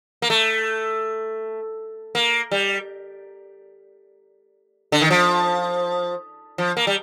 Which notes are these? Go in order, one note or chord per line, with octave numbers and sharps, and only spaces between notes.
A#3
A3
A#3
G3
D3
D#3
F3
F3
A#3
G3